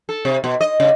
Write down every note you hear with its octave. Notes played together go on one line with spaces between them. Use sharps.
A4
C3
B2
D#5
C#3